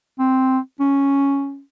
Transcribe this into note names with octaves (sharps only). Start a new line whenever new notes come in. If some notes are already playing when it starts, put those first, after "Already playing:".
C4
C#4